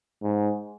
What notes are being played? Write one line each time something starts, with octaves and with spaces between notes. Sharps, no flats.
G#2